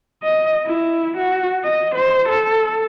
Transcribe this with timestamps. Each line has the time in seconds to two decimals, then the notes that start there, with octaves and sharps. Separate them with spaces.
0.23 D#5
0.66 E4
1.17 F#4
1.64 D#5
1.95 C5
2.29 A4